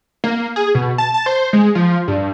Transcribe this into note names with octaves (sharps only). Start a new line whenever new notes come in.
A#3
G#4
B2
A5
A5
C5
G#3
F3
G2